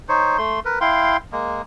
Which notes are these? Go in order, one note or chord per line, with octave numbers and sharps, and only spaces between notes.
D#4 C5 C#5
A3 C6
A#4 B4
E4 F5 G5 C6
G#3 A#3